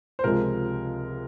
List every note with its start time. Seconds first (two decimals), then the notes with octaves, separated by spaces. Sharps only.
0.19 C5
0.24 C#2 C3 F3 G#3 A#4